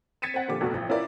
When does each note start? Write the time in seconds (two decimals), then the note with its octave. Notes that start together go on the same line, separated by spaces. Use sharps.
0.22 G#6 A6 B6 C#7 D#7 E7
0.34 C4 F#5
0.48 A#2 D3 F3 G4 D6
0.61 F1 B2 A3 F#4
0.74 A1 F3
0.89 C#4 E4 F4 A#4 B4 D5